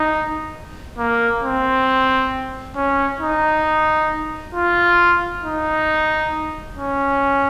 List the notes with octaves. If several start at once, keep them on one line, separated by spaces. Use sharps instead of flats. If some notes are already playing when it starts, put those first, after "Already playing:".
Already playing: D#4
A#3
C4
C#4
D#4
F4
D#4
C#4